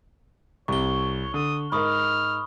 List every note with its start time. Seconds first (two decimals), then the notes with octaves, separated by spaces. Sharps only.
0.68 C2 C3 C#5 C#6 G7
1.34 D3 D#6
1.72 G#2 A#4 D#5 B5 C#6 D#6 F6